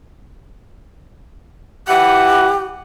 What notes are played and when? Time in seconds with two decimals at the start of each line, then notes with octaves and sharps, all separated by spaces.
1.88 E3 G4 F#5